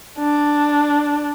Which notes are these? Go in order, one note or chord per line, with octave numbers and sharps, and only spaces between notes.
D4